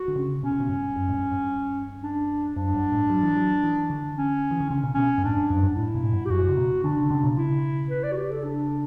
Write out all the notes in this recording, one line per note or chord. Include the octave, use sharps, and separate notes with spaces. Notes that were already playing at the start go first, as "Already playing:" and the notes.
Already playing: F#4
D3
C#3
B2 C#4
C#3
B2
G2
F#2
A2
G2
G2
D4
F#2 D4
G2
A2
F#3
E3
F#3
E3
D3
C#4
E3
D3
C#3 C#4
B2
B2 C#4
G2
A2 D4
G2
F#2
G2
D4
A2 E4
B2
A2
G2
G4
F#2 F#4
C#3
B2
D3 D4
C#3
C#3
B2
C#3 E4
B4
D5
F#4
G4
A4
D4